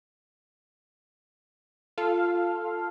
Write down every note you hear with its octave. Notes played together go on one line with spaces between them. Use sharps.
F4 A4 F5